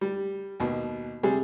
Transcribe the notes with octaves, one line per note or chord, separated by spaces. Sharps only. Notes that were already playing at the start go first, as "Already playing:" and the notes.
G3
D#2 B2
C3 G3 G#4